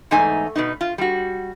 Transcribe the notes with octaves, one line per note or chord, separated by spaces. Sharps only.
E2 G#2 A3 D#4 G#5
B2 B3 D#4
F4
G3 F#4